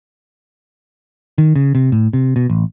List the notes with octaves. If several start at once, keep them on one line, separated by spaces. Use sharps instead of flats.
D#3
C#3
C3
A2
C3
B2
A1